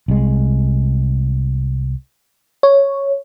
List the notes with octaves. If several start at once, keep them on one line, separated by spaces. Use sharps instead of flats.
C2 G#3
C#5